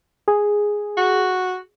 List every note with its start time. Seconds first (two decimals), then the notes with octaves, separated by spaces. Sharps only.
0.28 G#4
0.97 F#4